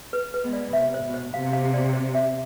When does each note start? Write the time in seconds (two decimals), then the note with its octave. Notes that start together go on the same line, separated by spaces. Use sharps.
0.13 B4
0.34 B4
0.43 G#3 B3
0.53 D5
0.73 C3 E5
0.94 C5
1.04 B2
1.14 C5
1.34 C3 F5
1.53 F5
1.74 D5
1.93 C5
2.15 E5